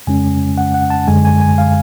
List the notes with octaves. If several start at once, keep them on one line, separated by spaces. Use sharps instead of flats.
F2 C#3 G#3 C#4 G#5
F#5
F#5
A5
F#2 D3 G#3 G#5
G#5
G#5
F5